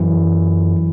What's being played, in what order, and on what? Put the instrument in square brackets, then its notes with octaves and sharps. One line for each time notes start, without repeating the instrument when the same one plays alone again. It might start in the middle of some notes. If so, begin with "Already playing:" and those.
Already playing: [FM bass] F#2 [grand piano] E3